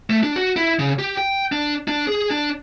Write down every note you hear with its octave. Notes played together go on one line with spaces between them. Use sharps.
A3
D4
F#4
E4
C#3
G4
G5
D4
D4
G#4
D4